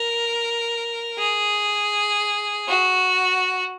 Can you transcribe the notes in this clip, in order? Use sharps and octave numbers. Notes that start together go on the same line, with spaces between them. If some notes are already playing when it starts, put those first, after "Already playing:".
Already playing: A#4
G#4
F#4